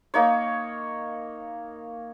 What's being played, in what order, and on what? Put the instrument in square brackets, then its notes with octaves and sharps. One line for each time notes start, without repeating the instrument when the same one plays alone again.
[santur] A#3 D#4 C#5